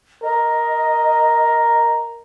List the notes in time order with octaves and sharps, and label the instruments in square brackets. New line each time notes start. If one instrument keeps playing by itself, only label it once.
[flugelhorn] A#4 [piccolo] D#5